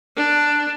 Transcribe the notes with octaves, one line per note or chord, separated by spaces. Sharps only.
D4